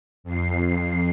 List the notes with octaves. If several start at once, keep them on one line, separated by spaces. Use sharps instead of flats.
F2 C7